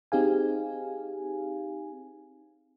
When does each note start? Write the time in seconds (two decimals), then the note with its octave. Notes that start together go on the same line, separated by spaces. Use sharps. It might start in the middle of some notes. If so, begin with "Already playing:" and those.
0.12 C4 D#4 G4 G#4 F5 G#5